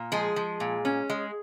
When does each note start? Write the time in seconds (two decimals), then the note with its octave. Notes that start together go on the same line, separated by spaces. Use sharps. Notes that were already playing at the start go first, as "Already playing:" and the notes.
Already playing: A#2
0.12 F3 G#3 G#4
0.36 F3
0.60 A#2
0.85 C#4
1.10 G#3